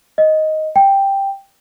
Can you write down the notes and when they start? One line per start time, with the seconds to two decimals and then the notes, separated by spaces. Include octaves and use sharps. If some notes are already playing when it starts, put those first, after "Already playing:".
0.18 D#5
0.76 G5